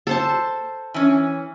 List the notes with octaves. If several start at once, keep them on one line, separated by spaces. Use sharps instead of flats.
A4 C5 A5
E3 C#4